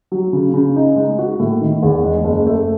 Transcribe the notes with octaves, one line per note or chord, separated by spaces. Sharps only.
F#3
C#3
C#3
D#4
G#3
F#4
A2
D#3
E2
G#3
F#1
A3